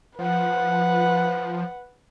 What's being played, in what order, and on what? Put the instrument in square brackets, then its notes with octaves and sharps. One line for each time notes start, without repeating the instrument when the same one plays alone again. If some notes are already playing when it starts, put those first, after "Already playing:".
[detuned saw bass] F3 [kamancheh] B4 F#5